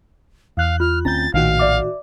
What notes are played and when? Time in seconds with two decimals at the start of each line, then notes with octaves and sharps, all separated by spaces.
0.57 E2 F5 F#6
0.80 F4 F6
1.05 D2 C4 C#4 A#5 G6 A6
1.34 A#1 A2 D#3 F#4 F5
1.59 D5 E5 D6